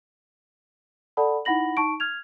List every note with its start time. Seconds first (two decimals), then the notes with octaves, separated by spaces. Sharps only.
1.17 A4 D5 F#5 A5 B5
1.45 D#4 E4 F#5 B5 A#6 F#7
1.77 D#4 A5 C#6 D7
2.00 F6 G#6 F7